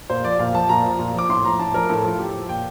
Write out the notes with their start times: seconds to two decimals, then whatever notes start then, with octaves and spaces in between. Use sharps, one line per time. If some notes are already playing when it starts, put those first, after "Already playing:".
0.10 A#2 C5
0.24 F3 D5
0.39 A#2 F5
0.54 F3 A5
0.69 A#2 A#5
0.84 F3
0.99 A#2
1.15 F3 D6
1.29 A2 C6
1.45 F3 A#5
1.59 A2 A5
1.74 F3 A#4
1.89 A2 A4
2.04 F3 F4
2.19 A2 G4
2.34 F3
2.49 A#2 G5